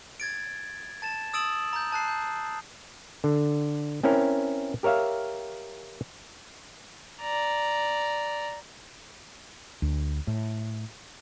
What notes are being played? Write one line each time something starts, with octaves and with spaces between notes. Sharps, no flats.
G#6 A6 D7
A5 A6 E7
D#6 E6 A6 D7 E7 F#7
A#5 G6
A5 F#6 C7
G6
D3
C4 C#4 E4 A#4
G4 A#4 C#5 E5 F5
D5 A#5
D2
A2